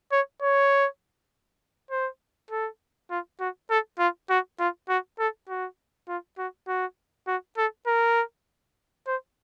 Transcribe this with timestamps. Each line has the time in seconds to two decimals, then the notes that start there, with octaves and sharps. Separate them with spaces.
0.12 C#5
0.42 C#5
1.91 C5
2.51 A4
3.10 F4
3.40 F#4
3.70 A4
3.99 F4
4.30 F#4
4.59 F4
4.89 F#4
5.19 A4
5.49 F#4
6.08 F4
6.38 F#4
6.68 F#4
7.27 F#4
7.58 A4
7.87 A#4
9.07 C5